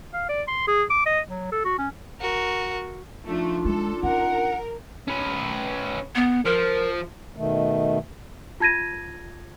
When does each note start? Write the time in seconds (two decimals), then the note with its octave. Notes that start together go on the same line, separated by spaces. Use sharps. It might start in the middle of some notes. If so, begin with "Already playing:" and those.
0.14 F5
0.29 D5
0.48 C6
0.68 G#4
0.90 D6
1.06 D#5
1.28 F#3
1.52 A4
1.65 F#4
1.78 C#4
2.20 F#4 A#4
3.26 F3 A3 D4 D#4 F4
3.65 G#3 A4
4.03 C#4 A#4 F#5
5.08 C#4 B4
6.15 B3
6.45 F3 A#4
7.37 B2 D#3 A3
8.60 F4 A5 G#6 A#6 D#7